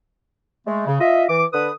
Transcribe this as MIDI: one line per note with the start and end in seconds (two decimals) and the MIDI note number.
0.66 0.84 56
0.66 0.84 57
0.86 0.96 49
1.00 1.23 65
1.00 1.23 75
1.00 1.23 76
1.29 1.44 52
1.29 1.44 86
1.53 1.69 50
1.53 1.69 71
1.53 1.69 87